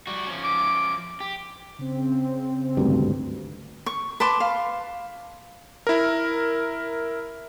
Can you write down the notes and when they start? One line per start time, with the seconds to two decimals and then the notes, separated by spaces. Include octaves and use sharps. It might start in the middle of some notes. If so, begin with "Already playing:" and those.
0.07 G3 F#4
0.27 F3 C#4
0.44 D6
1.20 G4
1.79 C#3 C4
2.77 G#1 D2 G2
3.86 C#6
4.20 B4 A5 C6 D6
4.40 F5
5.87 E4 A#4